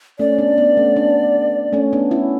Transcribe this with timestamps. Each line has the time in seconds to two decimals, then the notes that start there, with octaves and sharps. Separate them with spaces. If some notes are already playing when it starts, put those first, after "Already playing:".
0.19 A3 C#4 D5
0.38 B3 D4
0.58 B3 D4
0.77 A3 C#4
0.96 B3 D4
1.73 A3 C#4
1.93 B3 D4
2.11 C#4 E4